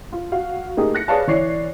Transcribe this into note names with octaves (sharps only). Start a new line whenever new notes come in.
F4
F#4 F5
A3 A#3 D#4 G4 G#4
F#6 A#6 C#7
G#4 B4 C#5 D5 F5 A5
E3 C#5 D5 C7